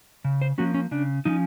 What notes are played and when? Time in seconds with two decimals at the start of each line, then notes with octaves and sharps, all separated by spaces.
0.25 C#3
0.42 C5
0.58 F3 A#3 C#4 F#4
0.74 C#4
0.91 C#3 D4
1.25 F3 A#3 C#4 D#4